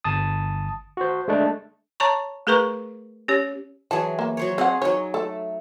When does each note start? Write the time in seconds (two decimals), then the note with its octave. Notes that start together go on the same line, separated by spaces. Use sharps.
0.04 G1 A5 D#6
0.97 F#4 C5
1.28 G#3 A3 D4
2.00 C#5 A5 A#5 C#6
2.47 A3 G#4 A#4 B4 A#5 C#6
3.28 C#4 G4 C#5
3.91 E3 F#3 G#4 A5
4.19 A#3
4.37 F#3 C5 C#5
4.58 C4 G#4 F5 F#5
4.82 F#3 D#4 C#5
5.14 A3 A4